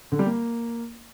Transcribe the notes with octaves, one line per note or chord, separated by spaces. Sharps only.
D3
G3
A#3